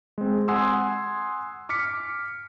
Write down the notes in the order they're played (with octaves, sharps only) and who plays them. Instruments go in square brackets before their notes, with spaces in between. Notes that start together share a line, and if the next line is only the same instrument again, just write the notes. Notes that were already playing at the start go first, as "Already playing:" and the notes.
[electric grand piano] G#3 C4
F#5 G#5 C6 D#6 E6
D6 F6 B6 C#7